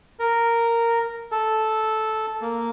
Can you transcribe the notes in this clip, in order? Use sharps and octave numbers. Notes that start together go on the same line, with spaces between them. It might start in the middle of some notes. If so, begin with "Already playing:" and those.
A#4
A4
A#3